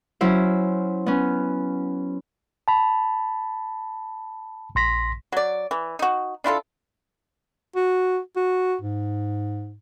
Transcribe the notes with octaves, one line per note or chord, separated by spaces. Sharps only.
F#3 C#4 E4 C5
B3 C#4
A5 B5
A#1 C6 A#6 B6
F#3 D5
E3
D#4 F#4
D4 E4 F4 A4
F#4
F#4
G#2